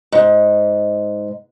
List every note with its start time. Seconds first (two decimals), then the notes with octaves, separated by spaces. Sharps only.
0.12 G#2